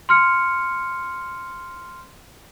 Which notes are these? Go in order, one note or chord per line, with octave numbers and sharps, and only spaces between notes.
C6 F6 C#7